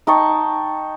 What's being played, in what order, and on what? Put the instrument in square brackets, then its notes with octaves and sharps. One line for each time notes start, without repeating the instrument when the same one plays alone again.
[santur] D#4 G5 A5 C#6